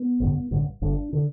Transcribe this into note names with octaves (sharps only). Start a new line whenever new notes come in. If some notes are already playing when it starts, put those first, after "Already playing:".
Already playing: B3
A1 G2 D3
A1 G2 D3
G1 G2 D3 D4
D3